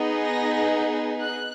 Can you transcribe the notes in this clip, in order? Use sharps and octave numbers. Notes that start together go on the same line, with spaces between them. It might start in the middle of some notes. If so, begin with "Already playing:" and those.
Already playing: B3 D#4 G#4
A#6
F#6